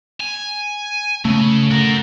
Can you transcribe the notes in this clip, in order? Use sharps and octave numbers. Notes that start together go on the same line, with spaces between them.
G#5
C#3 A3
F#4 A#4